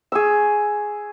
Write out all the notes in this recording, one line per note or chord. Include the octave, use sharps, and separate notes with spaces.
G#4 C#6 E6